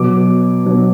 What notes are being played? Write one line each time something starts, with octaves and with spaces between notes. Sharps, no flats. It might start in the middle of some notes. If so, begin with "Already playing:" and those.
Already playing: B2 F#3 D6
B2 F#3